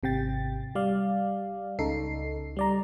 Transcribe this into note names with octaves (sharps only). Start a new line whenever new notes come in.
G#1 C3 G5 A6
G3 D5 F5
C#2 C#3 D#4 A4 C7
G3 D5 A#5